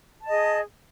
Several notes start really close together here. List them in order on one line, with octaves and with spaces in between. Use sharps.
A5 D#5 G#4